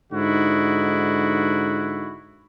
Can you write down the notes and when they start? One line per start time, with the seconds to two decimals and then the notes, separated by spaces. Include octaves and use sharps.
0.12 G#2 D3 D#4 E4 F#4